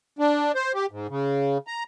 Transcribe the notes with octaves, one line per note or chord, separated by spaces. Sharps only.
D4
C5
G4
G#2
C#3
A#5